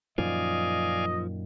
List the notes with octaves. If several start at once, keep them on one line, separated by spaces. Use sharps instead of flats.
F#2 A#2 D#3 F3 D5 D#5 F5 G#5